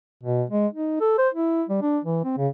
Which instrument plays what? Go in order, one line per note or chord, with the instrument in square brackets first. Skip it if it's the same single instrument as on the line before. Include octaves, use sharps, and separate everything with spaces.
[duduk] B2
G#3
D#4
A4
C5
E4
G3
D4
E3
C4
C#3